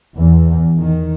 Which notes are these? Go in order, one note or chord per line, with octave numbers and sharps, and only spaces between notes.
E2
D#3